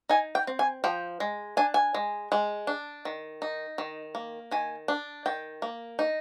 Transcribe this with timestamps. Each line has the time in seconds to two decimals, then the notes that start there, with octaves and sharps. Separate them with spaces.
0.09 D#4 G#5
0.35 G5
0.47 C4
0.59 G#5
0.84 F3 G5
1.20 G#3
1.57 D4 G#5
1.74 G#5
1.94 G#3
2.32 G#3
2.67 D4
3.05 D#3
3.42 D#4
3.78 D#3
4.15 A#3
4.51 D#3 G#5
4.88 D4
5.26 D#3 G5
5.62 A#3
5.99 D#4